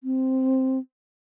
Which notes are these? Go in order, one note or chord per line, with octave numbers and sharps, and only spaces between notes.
C4